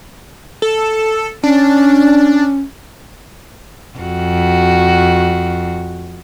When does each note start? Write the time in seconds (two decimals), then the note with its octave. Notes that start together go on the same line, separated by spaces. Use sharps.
0.62 A4
1.43 C#4 D4
3.99 F2 F#4